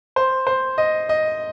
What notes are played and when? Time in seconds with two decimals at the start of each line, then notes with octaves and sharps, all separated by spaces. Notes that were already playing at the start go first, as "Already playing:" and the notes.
0.16 C5
0.47 C5
0.78 D#5
1.09 D#5